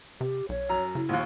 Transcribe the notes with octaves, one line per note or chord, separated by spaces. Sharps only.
C3 G4
B1 C#5
F#2 A#5
C#3 E4
A#1 D#2